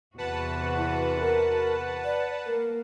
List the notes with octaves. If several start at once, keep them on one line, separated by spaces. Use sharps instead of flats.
E2 C3 F#4 B4 F#5 A5
E4
A#4
D5
A#3 A#4